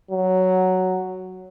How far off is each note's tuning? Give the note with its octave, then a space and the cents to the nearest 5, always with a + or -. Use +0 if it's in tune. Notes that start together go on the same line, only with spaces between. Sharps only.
F#3 +5